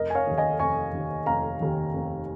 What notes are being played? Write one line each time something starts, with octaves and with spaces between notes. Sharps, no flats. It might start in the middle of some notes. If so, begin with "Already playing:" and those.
Already playing: F1 A#4 D#5
G#5
C#5 F5
D#2 D#3
D#5 G#5
F1 G#5 C#6
D#2 D#3
F1 F5 A#5
D#2 D#3
F1